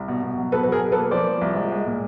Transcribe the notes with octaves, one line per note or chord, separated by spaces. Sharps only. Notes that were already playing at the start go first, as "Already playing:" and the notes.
Already playing: C2
B2
B2
F#3
B2 A4 B4
B4
F#3
G#4 A#4
B2
A4 B4
A#3
F3 C5 D5
F3
C2
G#3
G#3
A#2